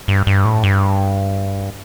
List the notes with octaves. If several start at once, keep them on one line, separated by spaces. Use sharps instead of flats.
G2
G2
A2
G2